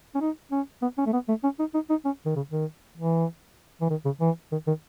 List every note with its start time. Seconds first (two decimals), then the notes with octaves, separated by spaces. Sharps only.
0.15 C#4
0.21 D#4
0.52 C#4
0.82 B3
0.98 C#4
1.06 A3
1.13 B3
1.29 A3
1.44 C#4
1.60 D#4
1.74 D#4
1.90 D#4
2.05 C#4
2.26 D#3
2.36 C#3
2.51 D#3
2.98 E3
3.81 E3
3.90 D#3
4.05 C#3
4.21 E3
4.52 D#3
4.67 D#3